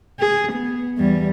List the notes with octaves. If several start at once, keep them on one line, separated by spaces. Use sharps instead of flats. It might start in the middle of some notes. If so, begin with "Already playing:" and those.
G#4
B3
E2 G3